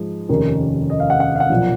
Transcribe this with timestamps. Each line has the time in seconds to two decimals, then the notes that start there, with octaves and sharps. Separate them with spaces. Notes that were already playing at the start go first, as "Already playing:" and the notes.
Already playing: G#2 F3 G#3
0.29 F1 D#2 D#3 A#3 C#4
0.90 D#5
1.00 F5
1.10 F#5
1.20 F#5
1.36 F5
1.40 F#5
1.50 B1 A#2 F3